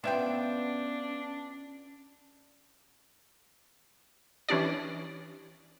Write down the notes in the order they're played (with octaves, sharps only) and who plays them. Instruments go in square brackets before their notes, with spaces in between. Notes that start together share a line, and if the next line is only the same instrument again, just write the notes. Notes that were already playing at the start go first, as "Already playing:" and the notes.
[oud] B3 F4 [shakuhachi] C#4 [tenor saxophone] D4 [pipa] C5 E5 G5
[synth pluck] E3 C#4 D4 G4 D5